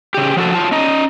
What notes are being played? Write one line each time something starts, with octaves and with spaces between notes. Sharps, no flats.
C#3 G4
F3 F#4 A4 A5
F#3 F4 A5
C#4 D#5 A#5